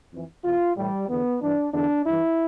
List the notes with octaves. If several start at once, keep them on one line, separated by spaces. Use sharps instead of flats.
F2 E3
E2 B2 F4
A2 E3 G3
E2 D3 B3
G2 E3 D4
E2 D3 D4
G2 E3 E4